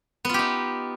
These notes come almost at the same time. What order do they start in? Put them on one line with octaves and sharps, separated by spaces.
B3 F4 G4 D#4